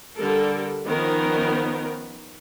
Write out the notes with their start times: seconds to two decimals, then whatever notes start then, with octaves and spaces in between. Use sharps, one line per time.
0.16 D3 G3 A4 A#4
0.86 D#3 F3 B3 C#4 A#4